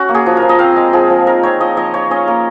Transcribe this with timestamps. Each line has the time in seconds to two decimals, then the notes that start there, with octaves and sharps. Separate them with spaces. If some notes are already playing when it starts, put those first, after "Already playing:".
Already playing: C#4 F#4
0.09 A#3
0.15 G#4
0.26 F3
0.37 A#4
0.42 F3
0.49 D#5
0.59 C4 F5
0.76 G#3
0.93 F3 G#4
1.10 F3
1.27 D#4 A#4
1.43 C4 C#5
1.60 F3 D#5
1.77 F3 D#5
1.94 F4 C#5
2.11 C#4 D#5
2.28 A#3 A#4